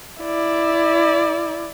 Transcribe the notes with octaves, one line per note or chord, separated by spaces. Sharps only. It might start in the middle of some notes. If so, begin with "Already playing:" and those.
E4 D5